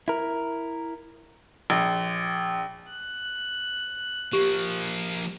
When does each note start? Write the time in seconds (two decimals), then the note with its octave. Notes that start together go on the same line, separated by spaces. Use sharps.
0.08 E4 A#4
1.70 A#1
2.90 F#6
4.33 F3 A#3 G4